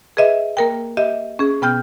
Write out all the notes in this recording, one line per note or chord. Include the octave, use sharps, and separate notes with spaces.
G#4 B4 D#5 E5
A#3 A#4 G5
G4 D#5 E5
C#4 G#4
B2 B3 G5 F6 G6